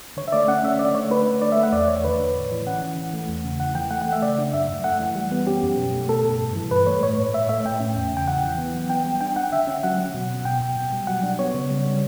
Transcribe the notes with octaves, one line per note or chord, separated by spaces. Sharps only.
D3 C#5
E5
A3 D5
C#4 F#5
A3 E5
D3 D5
A3 C#5
D4 B4
D4
A3 D5
E5
A3
F#5
E2 D5
A3 C#5
D3 B4
D3
A2
E3
C#4 F#5
E3
E3
A3
E2
C#3
E3 F#5
E3 G5
A3 F#5
F#5
A3
E5
C#3 D5
D4
F#2 E5
F#2
A3 F#5
E3
G3
B3
C#4 G4
F#2
B2
A3
B2 A4
B2
G2
E3
G2 B4
A3 C#5
A2 C#5
A2
A2 E5
A3 E5
A2 G5
C#4
E2
C#3 G5
E3 F#5
E3
B3
F#3
B3 G5
G3
D4 G5
D4 F#5
D3 E5
C#4
F#3 F#5
F#3
B2
B2
B2 G5
B2
B2
G3
F#3 F#5
D4
B3 C#5
C#3
G3
G3